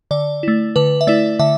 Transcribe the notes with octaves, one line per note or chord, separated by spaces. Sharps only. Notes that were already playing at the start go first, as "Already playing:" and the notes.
D3 D5
A3 E4
D3 B4
E5
A3 E4 D5
D3 E5